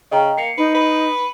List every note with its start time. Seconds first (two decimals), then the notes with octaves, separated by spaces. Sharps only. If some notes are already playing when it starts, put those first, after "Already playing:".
0.11 C#3 D#5 G5 A#5
0.38 A#3 C7 C#7
0.57 D#4 B4
0.75 B4